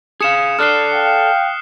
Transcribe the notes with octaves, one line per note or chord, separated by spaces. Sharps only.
G#4 F5 D#6 C#7 E7
A4 D5 F6 F#6 C7
F5 G5